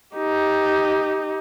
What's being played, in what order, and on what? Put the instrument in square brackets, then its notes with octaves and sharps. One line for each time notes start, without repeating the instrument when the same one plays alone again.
[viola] D#4 G4